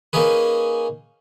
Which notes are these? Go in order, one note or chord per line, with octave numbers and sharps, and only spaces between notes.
A#3 C#4 D#4 G#4 B4